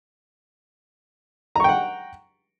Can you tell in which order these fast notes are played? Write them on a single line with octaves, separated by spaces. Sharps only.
A#5 C#6 G5 F#5